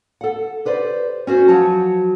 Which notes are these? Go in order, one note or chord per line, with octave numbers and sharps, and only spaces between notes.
A4 F#5
G4 B4 C5 D5
C#4 F#4 C5
F3 F#3 F#4 C#5 A5